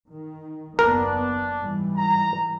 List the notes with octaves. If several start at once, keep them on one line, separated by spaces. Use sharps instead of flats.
D#3
F#1 D#2 B3 D4 A#4
G#2 E3 G3
A#5